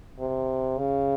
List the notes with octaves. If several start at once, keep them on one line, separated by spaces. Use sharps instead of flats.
C3
C#3